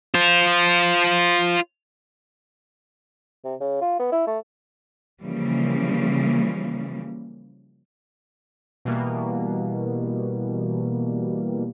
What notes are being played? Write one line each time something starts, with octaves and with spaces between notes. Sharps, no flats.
F4 C5
C3
C#3
F4
B3
E4
A3
C#3 E3 F3 G3 A#3
B2 E3 G3 A#3